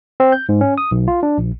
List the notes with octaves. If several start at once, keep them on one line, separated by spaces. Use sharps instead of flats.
C4
G6
G#2
C#4
D#6
B1
F4
D4
A#1